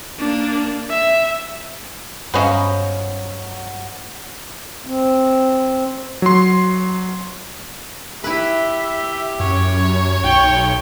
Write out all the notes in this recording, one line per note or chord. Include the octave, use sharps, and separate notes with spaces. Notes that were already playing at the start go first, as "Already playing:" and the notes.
A#3 D4
E5
G2 F#3 B3 C#4 C5 D#5 F5
C4
F#3 C6
E4 G4 B4 E5
F#2 C#5
B1 G5 C#6